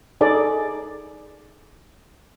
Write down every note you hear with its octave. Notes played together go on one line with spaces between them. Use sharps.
D#4 G#4 A4 D5